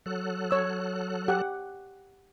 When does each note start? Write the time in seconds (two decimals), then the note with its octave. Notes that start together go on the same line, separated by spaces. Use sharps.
0.06 F#3 A4 F#6
0.51 C#5 E6
1.28 G4 F#5